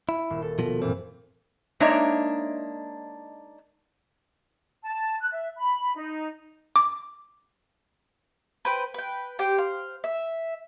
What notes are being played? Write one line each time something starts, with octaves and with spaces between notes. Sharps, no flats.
E4
D#1
A4
B2 F3
G2 A#2 E3 C4
G#3 A#3 D4 D#4 C#5 E5
A5
F#6
E5
B5
D#4
D6
B4 C5 G5
B4 G5
G4 C5 G5
C5 F5
E5